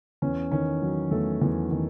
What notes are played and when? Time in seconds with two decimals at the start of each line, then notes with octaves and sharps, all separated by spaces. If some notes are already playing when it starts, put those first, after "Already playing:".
0.22 E2 C#4
0.51 D#3 C#4
0.82 F#3
1.11 E2 A3 A4
1.42 E2
1.71 D#3